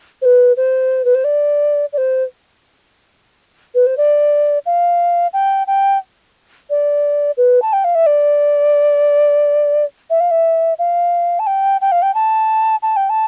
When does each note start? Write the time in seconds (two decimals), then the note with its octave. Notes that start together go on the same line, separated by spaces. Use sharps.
0.22 C5
0.25 B4
0.57 C5
1.05 B4
1.15 C5
1.24 D5
1.93 D5
1.98 C5
3.74 B4
3.86 C5
3.97 D5
4.66 F5
5.33 G5
5.67 G5
6.70 D5
7.37 B4
7.62 A5
7.73 G5
7.84 F5
7.95 E5
8.06 D5
10.10 E5
10.20 F5
10.31 E5
10.79 F5
11.39 A5
11.47 G5
11.81 G5
11.92 F5
12.02 G5
12.14 A5
12.82 A5
12.96 G5
13.10 A5